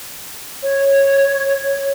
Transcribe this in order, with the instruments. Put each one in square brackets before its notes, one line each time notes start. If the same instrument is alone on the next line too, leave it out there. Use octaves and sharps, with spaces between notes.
[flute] C#5